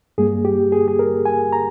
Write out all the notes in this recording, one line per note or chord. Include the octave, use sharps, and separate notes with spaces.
G2 G3 A#3 G#4
G4
G#4
G#4
A#4
G#5
A#5